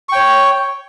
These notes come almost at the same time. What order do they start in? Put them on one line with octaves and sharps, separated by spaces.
C#6 G5 C#5